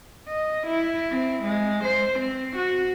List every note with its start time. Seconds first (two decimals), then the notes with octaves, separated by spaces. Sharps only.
0.28 D#5
0.67 E4
1.12 C4
1.44 G#3
1.84 C5
2.19 C4
2.56 F#4